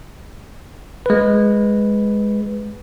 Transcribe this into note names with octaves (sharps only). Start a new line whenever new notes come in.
G#3 B4